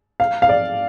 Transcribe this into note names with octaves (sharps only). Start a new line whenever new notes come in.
F5
F5
D5